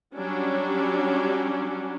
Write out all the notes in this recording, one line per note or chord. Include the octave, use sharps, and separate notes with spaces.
F#3 G3 C#4 D4